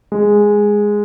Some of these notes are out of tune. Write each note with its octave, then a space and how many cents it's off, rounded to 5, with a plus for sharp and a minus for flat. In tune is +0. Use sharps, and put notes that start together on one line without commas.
G#3 -5